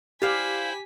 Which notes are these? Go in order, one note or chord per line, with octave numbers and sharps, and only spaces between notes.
E4 G4 C5 D5 F5 G#5 D6 B6